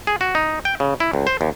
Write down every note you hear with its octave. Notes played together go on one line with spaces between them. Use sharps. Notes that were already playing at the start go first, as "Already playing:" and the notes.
G#4
F#4
D#4
G5
C#3
E4
C#2
C5
D#2